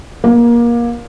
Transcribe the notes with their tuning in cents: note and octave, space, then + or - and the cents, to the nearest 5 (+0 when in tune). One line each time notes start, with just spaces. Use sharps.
A#3 +25